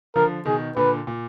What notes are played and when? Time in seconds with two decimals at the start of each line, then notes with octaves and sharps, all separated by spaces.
0.16 D3 F3 A#4
0.45 B2 D#3 G#4
0.77 A#2 D3 B4
1.07 A#2